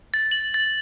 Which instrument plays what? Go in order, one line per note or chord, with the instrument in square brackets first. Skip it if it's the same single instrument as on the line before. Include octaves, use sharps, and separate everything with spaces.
[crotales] A6
F#7
A6